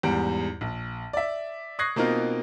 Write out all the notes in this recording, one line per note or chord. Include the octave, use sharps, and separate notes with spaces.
E2 G#2 G3 D7
A#1
D5 E5
C#6 D#6 F#6 G#6 A#6 C7
B2 A#3 C4 D#4 F4 A#4